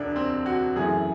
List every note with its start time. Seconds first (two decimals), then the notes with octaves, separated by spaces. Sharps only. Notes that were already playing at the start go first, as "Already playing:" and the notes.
Already playing: E1 D2 D3 D4
0.16 C4
0.46 F#4
0.76 F#2 C#3 E3 A3 G#4